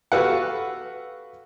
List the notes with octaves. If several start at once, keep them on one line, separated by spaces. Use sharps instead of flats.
F#4 G4 A4 B4 F5 F#5